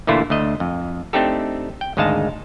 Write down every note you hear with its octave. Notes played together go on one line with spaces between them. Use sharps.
A#2 D3 E3 A3 E4 F4
D2 A3 D#5
F2
A3 C4 D4 D#4 G4 A4
G5
G#1 D2 G#3 D#4 F5 A5